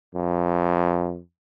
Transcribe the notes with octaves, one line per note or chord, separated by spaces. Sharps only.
F2